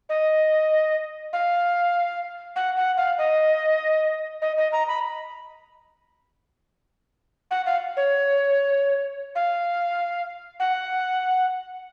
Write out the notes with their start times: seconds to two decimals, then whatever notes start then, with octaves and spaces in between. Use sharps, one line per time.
0.09 D#5
1.33 F5
2.56 F#5
2.77 F#5
2.97 F5
3.18 D#5
4.42 D#5
4.58 D#5
4.72 A#5
4.88 B5
7.51 F#5
7.66 F5
7.97 C#5
9.35 F5
10.60 F#5